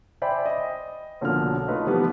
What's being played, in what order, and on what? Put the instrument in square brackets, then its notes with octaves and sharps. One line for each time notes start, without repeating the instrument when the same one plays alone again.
[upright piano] C5 D5 E5 G5 G#5 B5
D#5
B1 D3 F3 A#3 F6
A3 D#4 F4 B4
E3 F3 G3 B3 G4 B4